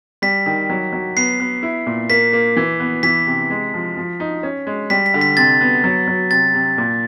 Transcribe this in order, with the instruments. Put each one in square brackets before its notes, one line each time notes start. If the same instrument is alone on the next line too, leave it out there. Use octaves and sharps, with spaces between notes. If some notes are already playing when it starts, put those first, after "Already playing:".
[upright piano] G3 [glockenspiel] B6
[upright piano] D#3
F#3
F#3
[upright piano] B3 [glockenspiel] C7
[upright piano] B3
E4
A#2
[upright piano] A#3 [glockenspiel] B6
[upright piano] A#3
E3
B3
[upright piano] E3 [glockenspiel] B6
[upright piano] C3
G#3
F3
F3
D#4
C#4
G#3
[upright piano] G3 [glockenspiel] B6
[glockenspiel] B6
[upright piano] D3
[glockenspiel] B6
[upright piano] C3 [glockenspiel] A6
[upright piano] B3
F#3
F#3
[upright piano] C3 [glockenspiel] A6
[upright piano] C3
A#2